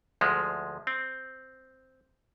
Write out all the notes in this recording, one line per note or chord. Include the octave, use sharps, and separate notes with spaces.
D2 F3 G#3
C4